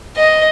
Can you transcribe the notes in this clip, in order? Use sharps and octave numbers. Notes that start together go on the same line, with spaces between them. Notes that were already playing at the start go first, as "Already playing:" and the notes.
D#5